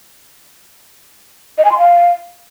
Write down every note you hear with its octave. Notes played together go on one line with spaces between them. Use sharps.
D#5
G#5
C6
F5